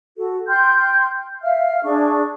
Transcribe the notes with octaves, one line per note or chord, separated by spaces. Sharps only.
F#4 A4
G5 C6 F6 G6
E5 F5 F6
D4 G#4 C#6